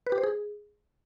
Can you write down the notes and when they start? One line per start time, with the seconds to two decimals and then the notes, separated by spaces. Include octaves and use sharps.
0.07 B4
0.12 G4
0.18 C5
0.23 G#4